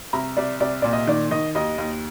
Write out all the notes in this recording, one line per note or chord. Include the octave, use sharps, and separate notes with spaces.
C2 A#5
C2 D5
C2 D5
A#2 D5
D#5
D#3 D5
D#3 D#5
D#2 D#5
D#2